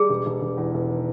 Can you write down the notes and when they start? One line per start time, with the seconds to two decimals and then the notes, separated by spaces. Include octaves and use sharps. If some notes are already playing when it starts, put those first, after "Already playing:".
Already playing: G3 G#4
0.09 E1
0.26 E1
0.42 E1
0.57 E2
0.74 E1
0.89 D#3